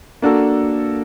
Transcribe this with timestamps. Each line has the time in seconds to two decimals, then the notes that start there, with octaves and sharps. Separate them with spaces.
0.22 A#3 D4 F#4 A4